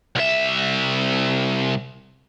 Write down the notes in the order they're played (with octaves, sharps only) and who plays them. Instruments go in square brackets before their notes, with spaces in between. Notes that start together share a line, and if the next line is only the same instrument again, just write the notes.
[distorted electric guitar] C2 E5